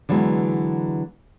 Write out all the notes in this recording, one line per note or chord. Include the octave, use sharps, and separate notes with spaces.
D3 E3 F#3 G#3 B3